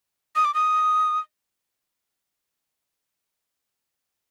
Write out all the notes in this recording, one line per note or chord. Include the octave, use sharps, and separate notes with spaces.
D#6
D6
D#6